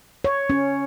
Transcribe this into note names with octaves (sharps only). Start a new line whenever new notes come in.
C#5
C#4